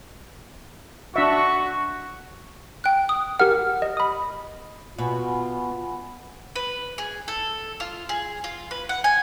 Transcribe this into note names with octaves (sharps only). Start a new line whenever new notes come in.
D4 F#4 E5 C#6
G5 F#6
D#6
G4 A#4 F#5 F6
D#5
B5 D#6
B2 F4 F#5 G#5 B5
B4
G#4
A4
F4
G#4
F4
B4
F#5
G#5